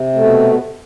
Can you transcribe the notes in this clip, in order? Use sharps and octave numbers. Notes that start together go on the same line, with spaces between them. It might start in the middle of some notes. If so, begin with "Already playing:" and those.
Already playing: C3
B2 A3